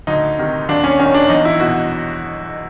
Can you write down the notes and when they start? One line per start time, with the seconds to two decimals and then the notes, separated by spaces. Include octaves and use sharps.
0.07 D2 D#4
0.38 C3 D#3
0.69 D#2 D4
0.84 C#4
0.99 D#3 C#4
1.14 D4
1.29 E2 D#4
1.45 E4
1.60 B2 F#4